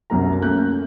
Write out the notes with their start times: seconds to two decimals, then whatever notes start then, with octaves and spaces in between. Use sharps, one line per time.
0.10 C2 F#2 F#3 A#4 A#5
0.41 A3 A#3 C#4 F#6 G6